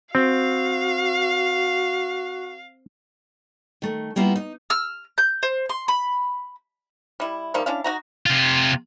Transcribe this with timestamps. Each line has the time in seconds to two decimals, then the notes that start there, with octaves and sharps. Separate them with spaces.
0.15 C4 F#4 F5
3.82 D#3 A3
4.16 G3 A#3 B3 E4 F4
4.36 D#4
4.70 E6 F6
5.18 G6
5.43 C5
5.69 C6
5.88 B5
7.20 G3 E4
7.54 D#3 F3 G3 A#3
7.66 C#4 D4 E4 F5
7.84 D#4 F#4 A#5
8.26 C3 F4